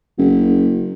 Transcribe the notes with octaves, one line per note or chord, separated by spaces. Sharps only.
F#1